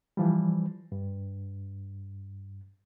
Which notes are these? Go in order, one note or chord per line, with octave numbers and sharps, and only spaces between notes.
E3 F3 G3
G2